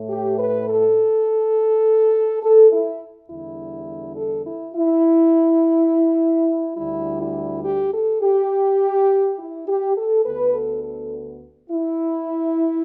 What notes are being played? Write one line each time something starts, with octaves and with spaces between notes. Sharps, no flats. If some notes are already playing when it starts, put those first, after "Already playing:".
Already playing: A2 A3
G4
B4
A4
A4
E4
E2 D3 G3 E4
A4
E4
E4
D2 D3 G3 E4
E4
G4
A4
G4
E4
G4
A4
D2 D3 B3 B4
A4
A4
E4